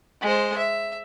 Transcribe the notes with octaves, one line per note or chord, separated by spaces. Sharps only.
G#3 C5
E5